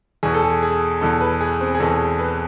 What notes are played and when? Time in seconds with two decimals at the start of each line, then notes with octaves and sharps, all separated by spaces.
0.23 E2 B2 G#4
0.34 A4
0.44 G#4
0.63 G#4
1.01 E2 B2 A4
1.21 B4
1.41 G#4
1.61 C4
1.75 G#4
1.80 E2 B2 A4
2.19 B4